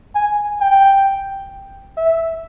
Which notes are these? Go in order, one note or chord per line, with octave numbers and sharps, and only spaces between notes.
G#5
G5
E5